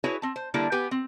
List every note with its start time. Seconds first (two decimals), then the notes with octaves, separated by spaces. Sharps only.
0.04 E4 F#4 G#4 B4 C#5
0.22 C4 A5
0.36 C5
0.54 D3 G3 A#3 D4 E4
0.72 B3 G4 B4 G5 G#5
0.91 C4